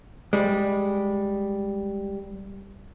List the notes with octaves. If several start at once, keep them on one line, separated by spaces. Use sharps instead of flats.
G3 G#3